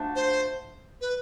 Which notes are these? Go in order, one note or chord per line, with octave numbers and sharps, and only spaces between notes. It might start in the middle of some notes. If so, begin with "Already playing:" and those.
Already playing: F3 A3 D4 F#4
C5
B4